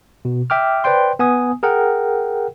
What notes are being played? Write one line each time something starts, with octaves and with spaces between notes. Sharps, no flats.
B2
E5 G5 D6 F6
B4 C5 D5 G5 C6
B3 G#5 D#6
G#4 A#4 F#5 G5